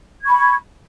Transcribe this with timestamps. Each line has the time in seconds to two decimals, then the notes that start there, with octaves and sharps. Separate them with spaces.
0.22 G#6
0.25 C#6
0.28 B5